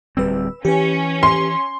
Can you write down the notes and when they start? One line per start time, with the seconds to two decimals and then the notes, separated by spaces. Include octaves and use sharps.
0.17 D1 G3 C4 B4 E6
0.65 E3 C#4 G4 B4
1.23 C6